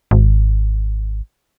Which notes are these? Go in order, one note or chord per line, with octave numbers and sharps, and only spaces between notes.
G#1